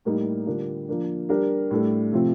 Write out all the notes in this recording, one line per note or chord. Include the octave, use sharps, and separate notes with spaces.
A2 G3 A#3 D#4
D3 G3 D4 F4 A#4
F3 A#3 D4
G3 D4 G4 A#4
A2 G3 D4 A4
C3 F3 A3 C4 F4